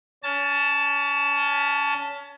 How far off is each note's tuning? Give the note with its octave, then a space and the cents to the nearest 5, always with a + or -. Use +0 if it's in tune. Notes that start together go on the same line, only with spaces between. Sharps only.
C#4 +30 A5 +0